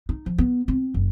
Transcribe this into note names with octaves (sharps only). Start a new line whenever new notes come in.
D#4
F3
B3
C4
F#1